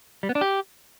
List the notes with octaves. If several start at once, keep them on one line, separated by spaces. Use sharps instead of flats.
G3
B3
D4
G4